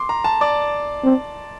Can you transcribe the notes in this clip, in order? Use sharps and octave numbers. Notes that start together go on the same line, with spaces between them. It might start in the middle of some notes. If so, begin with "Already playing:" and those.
Already playing: C6 D6
A#5
A5
D5
C4